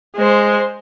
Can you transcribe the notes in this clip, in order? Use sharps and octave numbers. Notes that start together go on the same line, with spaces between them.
G#3 C5